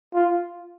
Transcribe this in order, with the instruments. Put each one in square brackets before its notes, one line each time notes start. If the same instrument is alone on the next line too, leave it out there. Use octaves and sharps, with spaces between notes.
[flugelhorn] F4